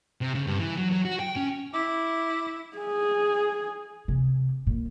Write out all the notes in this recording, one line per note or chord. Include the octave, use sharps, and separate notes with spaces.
C3
C#3
G2
E3
F#3
F#3
F#4
G5
C#4
E4 D6
G#4
C3
A#2